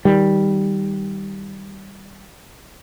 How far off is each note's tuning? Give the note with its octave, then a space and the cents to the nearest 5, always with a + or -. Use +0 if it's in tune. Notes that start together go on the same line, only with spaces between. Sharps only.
D#3 +15 G3 +0